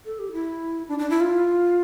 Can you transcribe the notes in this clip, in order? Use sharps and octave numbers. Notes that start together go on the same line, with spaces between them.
A4
G4
E4
D4
D4
E4
F4